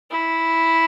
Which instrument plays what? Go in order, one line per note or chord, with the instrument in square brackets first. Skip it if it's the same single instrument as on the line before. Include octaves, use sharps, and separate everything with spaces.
[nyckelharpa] E4